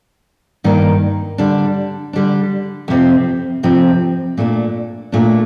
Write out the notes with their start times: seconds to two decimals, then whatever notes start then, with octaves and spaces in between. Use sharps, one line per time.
0.64 G2 D#3 A#3 D#4
1.38 D3 G3 D4
2.13 D3 G3 D4
2.88 F2 C3 F3 C4
3.63 F2 C3 F3 C4
4.38 A#2 A3 D4
5.12 A#2 A3 D4